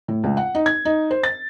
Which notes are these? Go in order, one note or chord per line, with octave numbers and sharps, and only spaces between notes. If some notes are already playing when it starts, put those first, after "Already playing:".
A2
C#2
F#5
D#4
G#6
D#4
C5
A6